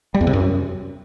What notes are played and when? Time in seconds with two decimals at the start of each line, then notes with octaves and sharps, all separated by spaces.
0.14 G3
0.21 E2
0.27 C3
0.33 F#2